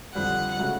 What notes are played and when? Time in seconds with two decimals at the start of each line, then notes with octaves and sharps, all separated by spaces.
0.15 F2 D3 G3 F#5
0.58 C#3 F#3 A3